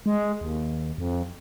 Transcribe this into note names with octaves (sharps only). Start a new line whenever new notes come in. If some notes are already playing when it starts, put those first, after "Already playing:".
G#3
D#2
F2